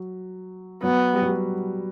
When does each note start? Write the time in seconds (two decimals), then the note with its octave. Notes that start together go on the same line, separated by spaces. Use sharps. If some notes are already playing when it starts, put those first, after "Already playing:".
Already playing: F#3
0.83 F#3 B3
1.14 G3
1.22 F#3
1.29 G3